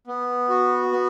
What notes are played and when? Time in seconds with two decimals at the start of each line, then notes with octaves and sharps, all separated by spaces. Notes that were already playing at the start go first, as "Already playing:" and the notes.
0.07 B3
0.49 F#4
0.92 B3